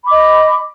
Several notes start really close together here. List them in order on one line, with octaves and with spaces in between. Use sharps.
B5 D6 D#5